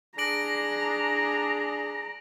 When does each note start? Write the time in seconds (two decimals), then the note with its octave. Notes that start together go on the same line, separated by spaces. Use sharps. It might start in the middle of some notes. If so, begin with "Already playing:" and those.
0.18 D4 G#4 A#5 A#6 D7 F#7